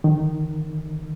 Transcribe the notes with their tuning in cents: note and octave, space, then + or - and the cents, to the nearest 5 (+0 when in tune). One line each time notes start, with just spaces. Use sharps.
D#3 -15